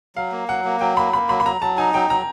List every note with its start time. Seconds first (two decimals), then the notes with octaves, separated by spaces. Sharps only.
0.16 F#3 F5
0.32 A#3
0.48 F#3 F#5
0.65 A#3
0.80 F#3 G5
0.97 A#3 B5
1.13 A#3 B5
1.29 F#3 B5
1.40 B5
1.45 F#3 A#5
1.61 F#3 A5
1.78 D#4 G#5
1.94 F#3 G5
2.10 F#3 A#5